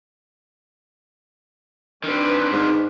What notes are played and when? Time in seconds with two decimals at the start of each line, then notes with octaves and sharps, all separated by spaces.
2.04 D#3 C4 D4 B4
2.52 G#2